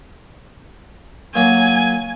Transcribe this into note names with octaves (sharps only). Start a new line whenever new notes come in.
F#3 A#3 G#5